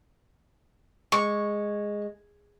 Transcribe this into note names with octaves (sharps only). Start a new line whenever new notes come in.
G#3 C#6